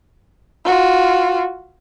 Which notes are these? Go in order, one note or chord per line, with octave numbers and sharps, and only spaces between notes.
F4 F#4